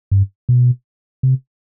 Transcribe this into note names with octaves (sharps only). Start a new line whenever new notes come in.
G2
B2
C3